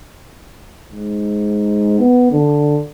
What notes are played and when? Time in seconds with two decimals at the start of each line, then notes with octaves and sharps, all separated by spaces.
0.92 G#2
1.99 B3
2.32 D3